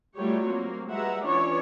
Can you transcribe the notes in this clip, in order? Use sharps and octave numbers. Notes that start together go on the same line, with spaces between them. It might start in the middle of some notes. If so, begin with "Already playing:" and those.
F#3 G3 A3 F4 G4 C#5
A#3 C4 F#4
G3 G#3 B4 E5 F#5 A#5
E3 C#4 D4 F4 C#5 D5